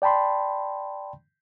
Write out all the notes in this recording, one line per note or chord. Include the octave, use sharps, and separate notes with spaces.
D5 G5 A5 B5 C6